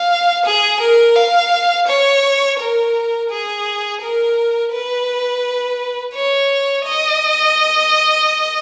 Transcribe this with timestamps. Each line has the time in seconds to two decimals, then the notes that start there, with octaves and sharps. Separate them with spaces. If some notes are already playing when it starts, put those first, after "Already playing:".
Already playing: F5
0.45 G#4
0.80 A#4
1.16 F5
1.87 C#5
2.59 A#4
3.30 G#4
4.01 A#4
4.72 B4
6.14 C#5
6.86 D#5